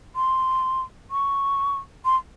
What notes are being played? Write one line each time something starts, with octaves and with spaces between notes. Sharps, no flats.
C6
C#6
C6